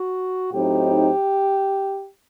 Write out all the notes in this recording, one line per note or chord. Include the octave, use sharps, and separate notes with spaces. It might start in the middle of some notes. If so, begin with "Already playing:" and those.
Already playing: F#4
A2 F#3 C4 D#4 G4